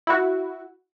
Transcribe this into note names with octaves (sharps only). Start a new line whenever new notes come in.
E4 F#4